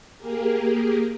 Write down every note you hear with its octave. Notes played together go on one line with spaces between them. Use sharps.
A#3 G4 G#4 A#4